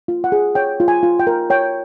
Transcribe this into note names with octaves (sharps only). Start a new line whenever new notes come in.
F4
F#5
G#4
C#5 G5
F4
G#5
F4
G5
A#4
C#5 G5